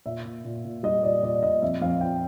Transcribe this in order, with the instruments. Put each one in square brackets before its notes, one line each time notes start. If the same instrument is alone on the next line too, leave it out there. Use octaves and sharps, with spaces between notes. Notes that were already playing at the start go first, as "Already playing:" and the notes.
[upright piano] A#2 E5
A#2
A#2
A#2
G3 D#5
A#2 D5
A#2 D5
A#2 D#5
F2 E5
F2 F5
F3 G5